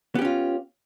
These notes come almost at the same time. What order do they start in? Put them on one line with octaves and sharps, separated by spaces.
B3 G4 C#4 F4